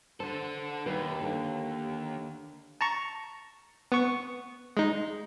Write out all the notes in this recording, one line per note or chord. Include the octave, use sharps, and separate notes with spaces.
D3 A4 C5
D#2 D#4 A#4 B4
D3 A#3
A5 A#5 C#6
B3 C#6
G#3 D#4